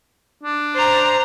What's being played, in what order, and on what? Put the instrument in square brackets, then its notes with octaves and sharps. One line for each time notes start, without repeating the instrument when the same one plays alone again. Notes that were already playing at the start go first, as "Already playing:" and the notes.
[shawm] D4
[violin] C5 A#5